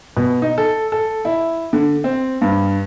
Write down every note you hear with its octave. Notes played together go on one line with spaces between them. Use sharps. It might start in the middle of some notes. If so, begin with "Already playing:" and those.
B2
D#4
A4
A4
E4
D3
C4
G2